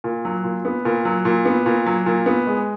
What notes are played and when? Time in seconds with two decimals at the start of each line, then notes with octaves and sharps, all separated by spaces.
0.04 A#2
0.25 F#3
0.44 A#2
0.65 B3
0.85 A#2
1.05 F#3
1.25 A#2
1.45 B3
1.66 A#2
1.86 F#3
2.06 A#2
2.26 B3
2.47 G#3